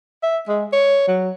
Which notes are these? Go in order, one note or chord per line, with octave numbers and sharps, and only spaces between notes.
E5
G#3
C#5
F#3